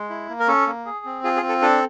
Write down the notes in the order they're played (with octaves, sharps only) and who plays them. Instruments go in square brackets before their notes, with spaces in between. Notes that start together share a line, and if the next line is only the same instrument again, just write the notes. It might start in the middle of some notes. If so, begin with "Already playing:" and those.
Already playing: [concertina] G#3
E4
A#3
A#4
C#4 A4
A#3
G#4
C4
F4 G#4
G#4
C4
A4
D4 A4